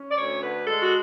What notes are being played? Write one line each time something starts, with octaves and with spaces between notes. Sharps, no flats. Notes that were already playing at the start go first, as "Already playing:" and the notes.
Already playing: C#4
D5
D2 C#5
D3 B4
G#3 A4
F#4